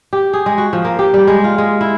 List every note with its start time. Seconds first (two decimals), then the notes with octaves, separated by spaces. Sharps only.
0.13 G4
0.33 G#4
0.46 G#3
0.58 F#4
0.73 F3
0.85 A#3
0.99 G4
1.14 G3
1.28 G#3
1.44 F4
1.58 G#3
1.81 E4